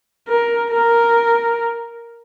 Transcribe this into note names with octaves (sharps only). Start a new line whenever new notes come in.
A#4
A#4